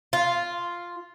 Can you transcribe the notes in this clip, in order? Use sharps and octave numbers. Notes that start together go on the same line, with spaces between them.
F4